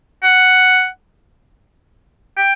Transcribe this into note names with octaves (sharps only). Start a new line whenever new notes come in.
F#5
G5